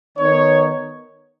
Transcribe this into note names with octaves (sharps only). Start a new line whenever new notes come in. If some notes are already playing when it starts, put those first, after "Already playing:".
D#3 B3 D#4 C#5